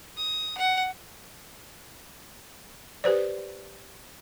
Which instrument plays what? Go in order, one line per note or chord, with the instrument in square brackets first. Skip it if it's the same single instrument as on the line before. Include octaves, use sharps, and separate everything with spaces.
[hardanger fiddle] D#6
F#5
[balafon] G4 B4 C5 D5